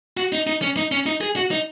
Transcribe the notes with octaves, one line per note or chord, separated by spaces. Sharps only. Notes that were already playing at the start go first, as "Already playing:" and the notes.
F#4
D#4
D#4
C#4
D#4
C#4
D#4
G#4
F#4
D#4